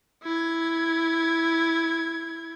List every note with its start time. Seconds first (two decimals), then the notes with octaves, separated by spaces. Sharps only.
0.23 E4 G#6